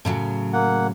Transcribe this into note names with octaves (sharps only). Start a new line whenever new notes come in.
A2 C#3 F#3
A#3 F#5